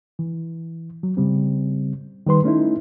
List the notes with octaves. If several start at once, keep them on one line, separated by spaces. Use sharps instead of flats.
E3
F#3
C#3 G3 C4
D#3 G3 B4 C6
A3 C#4 D#4 E4